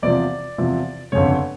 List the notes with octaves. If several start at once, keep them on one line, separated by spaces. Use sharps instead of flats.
E2 C3 F3 D5
E2 C3 F3
G1 F2 C#3 C#5